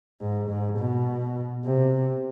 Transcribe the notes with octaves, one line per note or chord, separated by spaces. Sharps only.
G#2
G#2
B2
C3